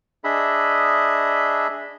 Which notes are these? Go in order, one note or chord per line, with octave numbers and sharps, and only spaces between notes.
D4 G#4 D#5 E5 B5